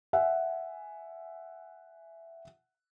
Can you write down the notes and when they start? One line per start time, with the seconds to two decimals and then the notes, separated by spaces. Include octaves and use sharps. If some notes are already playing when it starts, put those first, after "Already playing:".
0.13 E5 F#5 G#5